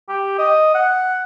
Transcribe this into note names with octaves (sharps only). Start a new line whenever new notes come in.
G4
D#5
F#5